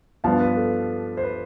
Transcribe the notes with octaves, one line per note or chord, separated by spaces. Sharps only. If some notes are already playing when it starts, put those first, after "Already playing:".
G2 F3 B3 D4 F5 A5
B4
A4
C5
B4